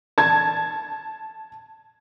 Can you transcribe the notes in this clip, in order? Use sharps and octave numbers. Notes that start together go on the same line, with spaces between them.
A5 G#6